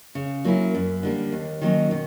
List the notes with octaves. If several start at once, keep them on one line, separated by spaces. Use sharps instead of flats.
C#3
F#3 A#3 C#4 E4
F#2
D3 G3 A#3
D#2
D#3 F#3 A#3 C#4
B2